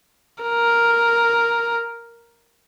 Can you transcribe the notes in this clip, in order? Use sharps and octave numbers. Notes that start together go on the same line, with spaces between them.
A#4